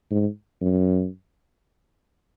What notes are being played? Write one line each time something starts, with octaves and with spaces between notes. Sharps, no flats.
G#2
F#2